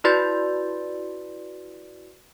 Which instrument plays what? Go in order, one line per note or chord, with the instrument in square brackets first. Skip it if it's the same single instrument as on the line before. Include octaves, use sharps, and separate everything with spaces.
[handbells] E4 F#4 B4 D5 C6 A6